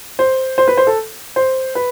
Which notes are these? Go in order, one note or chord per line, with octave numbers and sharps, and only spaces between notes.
C5
C5
B4
C5
A4
C5
B4